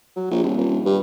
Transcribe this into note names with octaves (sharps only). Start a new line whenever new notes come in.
F#3
A#1
D#1
D#1
G2